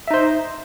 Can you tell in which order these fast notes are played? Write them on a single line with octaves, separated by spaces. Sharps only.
E5 D#4 C5